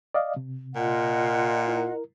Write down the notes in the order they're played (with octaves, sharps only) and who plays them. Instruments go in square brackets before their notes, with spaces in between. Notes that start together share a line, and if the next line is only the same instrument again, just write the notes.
[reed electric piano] D5 D#5 F5
C3
[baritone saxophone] A#2 [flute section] F4 D#5 F#5
[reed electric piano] E4 A#4